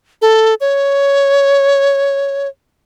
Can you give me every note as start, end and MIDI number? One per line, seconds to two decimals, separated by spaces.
0.22 0.54 69
0.61 2.48 73